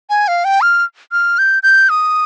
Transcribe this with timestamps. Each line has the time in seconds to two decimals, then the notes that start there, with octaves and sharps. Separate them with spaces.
0.10 G#5
0.28 F5
0.45 G5
0.61 F6
1.12 F6
1.38 G6
1.63 G6
1.89 D#6